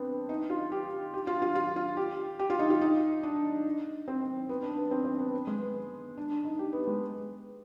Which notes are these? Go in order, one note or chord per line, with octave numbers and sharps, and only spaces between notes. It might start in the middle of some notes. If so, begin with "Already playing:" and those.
Already playing: B3 C4 D4
D#4
F4
G4
G4
F4
F4
F4
F4
G4
G4
F4
D#4
F4
D#4
D4
C4
B3
D4
B3
C4
C4
B3
G#3
B3
D4
D4
D#4
G4
B3
G#3